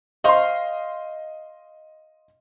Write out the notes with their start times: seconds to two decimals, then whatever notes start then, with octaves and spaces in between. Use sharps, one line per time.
0.24 C5 D#5 F5 C6 C#6